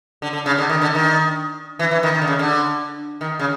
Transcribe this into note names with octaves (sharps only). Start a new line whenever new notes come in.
D3
D3
C#3
D3
D#3
D3
D#3
E3
E3
D#3
D#3
D3
C#3
D3
D#3
C#3